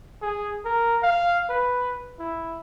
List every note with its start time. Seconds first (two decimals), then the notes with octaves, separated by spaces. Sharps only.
0.22 G#4
0.65 A#4
1.03 F5
1.49 B4
2.19 E4